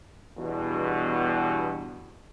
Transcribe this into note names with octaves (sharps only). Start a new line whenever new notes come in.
E2 G2 B2